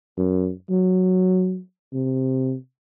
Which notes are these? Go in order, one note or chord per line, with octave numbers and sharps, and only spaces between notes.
F#2
F#3
C3